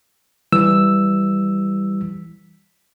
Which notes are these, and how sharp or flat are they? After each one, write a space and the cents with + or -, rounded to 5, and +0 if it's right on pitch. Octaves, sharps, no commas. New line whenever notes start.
E3 +0 G3 +0 E6 +0